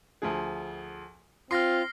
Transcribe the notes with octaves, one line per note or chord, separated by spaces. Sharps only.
D2 F3 G#4
C4 F4 C6 F6 A#6 C7